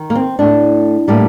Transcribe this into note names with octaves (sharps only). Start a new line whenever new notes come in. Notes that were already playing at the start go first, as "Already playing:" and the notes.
Already playing: D#3
A#3
C4
A2 A3 D4
A2 G3 A#3